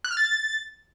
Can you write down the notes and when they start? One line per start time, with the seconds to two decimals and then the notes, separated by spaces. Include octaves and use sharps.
0.04 F#6
0.11 F6
0.17 A6